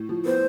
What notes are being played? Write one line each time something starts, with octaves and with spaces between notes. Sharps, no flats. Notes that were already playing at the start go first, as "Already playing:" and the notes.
Already playing: A2
F3
B3 C5